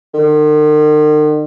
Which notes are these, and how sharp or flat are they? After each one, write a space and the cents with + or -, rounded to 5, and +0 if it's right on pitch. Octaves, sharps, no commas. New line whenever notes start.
D#3 -45